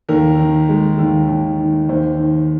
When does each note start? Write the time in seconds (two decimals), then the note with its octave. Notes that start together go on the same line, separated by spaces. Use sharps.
0.09 D#2 A#4
0.39 D#3
0.69 G#3
0.99 D#2
1.29 D#2
1.59 D#3
1.89 D#2 C5
2.19 D#3